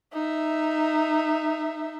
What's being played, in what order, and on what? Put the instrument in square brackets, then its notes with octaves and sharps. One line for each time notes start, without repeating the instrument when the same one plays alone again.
[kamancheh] D#4 E5